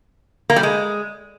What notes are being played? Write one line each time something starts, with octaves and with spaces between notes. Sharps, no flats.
A#3
G3
G#3